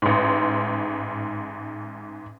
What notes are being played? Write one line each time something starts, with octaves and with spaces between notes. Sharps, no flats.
A1 G#2